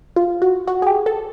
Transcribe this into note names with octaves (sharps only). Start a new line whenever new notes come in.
F4
F#4
F#4
G#4
G4
A4